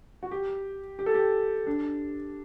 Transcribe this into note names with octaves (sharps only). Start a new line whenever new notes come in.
F#4
G4
G4
A4
G4
D4